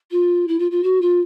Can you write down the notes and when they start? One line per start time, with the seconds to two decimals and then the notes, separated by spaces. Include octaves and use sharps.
0.11 F4
0.48 E4
0.59 F4
0.71 F4
0.83 F#4
1.01 F4